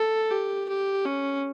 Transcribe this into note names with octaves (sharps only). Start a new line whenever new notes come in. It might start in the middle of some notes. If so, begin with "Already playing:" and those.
Already playing: A4
G4
G4
C#4